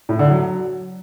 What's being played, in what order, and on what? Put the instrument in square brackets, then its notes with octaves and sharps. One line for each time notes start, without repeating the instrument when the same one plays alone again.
[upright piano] A2
D3
F#3